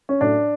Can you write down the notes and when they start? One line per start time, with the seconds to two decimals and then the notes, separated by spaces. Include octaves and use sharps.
0.09 C#4
0.21 A2 F#3 D4